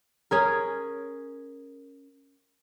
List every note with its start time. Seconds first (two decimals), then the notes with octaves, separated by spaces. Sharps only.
0.31 C#4 G#4 A#4